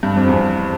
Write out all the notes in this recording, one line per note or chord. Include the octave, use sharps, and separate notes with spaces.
G2
F2
E2